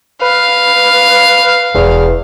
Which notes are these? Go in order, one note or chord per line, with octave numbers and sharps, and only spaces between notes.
B4 F5
E1 E2